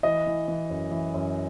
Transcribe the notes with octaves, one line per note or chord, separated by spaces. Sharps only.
E3 D#5
E3
E3
F#2
E3
F#2